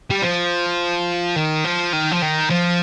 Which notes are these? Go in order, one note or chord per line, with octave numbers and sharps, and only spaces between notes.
G3
F3
D#3
F3
D#3
F3
D#3
F3